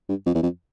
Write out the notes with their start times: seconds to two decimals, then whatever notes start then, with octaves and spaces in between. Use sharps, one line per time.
0.09 G2
0.26 F2
0.35 E2
0.43 F2